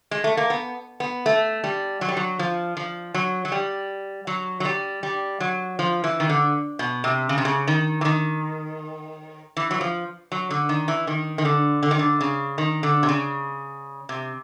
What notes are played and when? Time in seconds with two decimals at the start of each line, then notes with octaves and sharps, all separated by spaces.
0.11 G#3
0.24 A3
0.37 A#3
0.50 B3
1.00 B3
1.26 A3
1.64 G3
2.01 F#3
2.08 G3
2.17 F#3
2.39 F3
2.77 F3
3.14 F#3
3.45 F#3
3.52 G3
4.27 F#3
4.60 F#3
4.65 G3
5.03 G3
5.40 F#3
5.79 F3
6.04 E3
6.20 D#3
6.30 D3
6.79 B2
7.04 C3
7.29 C#3
7.38 C3
7.45 C#3
7.67 D#3
8.01 E3
8.05 D#3
9.57 E3
9.71 F#3
9.81 F3
10.32 F#3
10.50 D3
10.69 D#3
10.88 E3
11.07 D#3
11.38 D#3
11.45 D3
11.83 D3
11.91 D#3
11.99 D3
12.21 C#3
12.58 D#3
12.83 D3
13.03 C3
13.09 C#3
14.09 C3